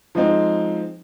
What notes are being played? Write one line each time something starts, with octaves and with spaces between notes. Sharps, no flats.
F3 G#3 C4 D#4